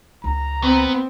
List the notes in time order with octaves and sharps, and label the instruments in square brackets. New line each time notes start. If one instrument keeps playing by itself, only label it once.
[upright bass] C#2 [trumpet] A#5
[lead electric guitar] B3 [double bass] C4